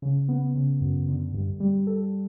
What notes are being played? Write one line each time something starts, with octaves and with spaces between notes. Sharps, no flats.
C#3
B3
C#3
F#2
D3
G2
G3
A4